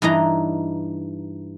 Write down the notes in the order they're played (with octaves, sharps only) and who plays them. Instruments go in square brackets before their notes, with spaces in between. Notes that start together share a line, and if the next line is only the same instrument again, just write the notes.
[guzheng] G2 E3 D#4 A#5